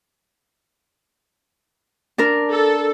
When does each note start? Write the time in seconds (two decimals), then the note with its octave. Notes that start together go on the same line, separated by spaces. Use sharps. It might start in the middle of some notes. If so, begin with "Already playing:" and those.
2.18 D4 A#4
2.52 A4